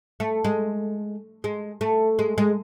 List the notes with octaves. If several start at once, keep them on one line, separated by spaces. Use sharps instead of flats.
A3
G#3
G#3
A3
G#3
G#3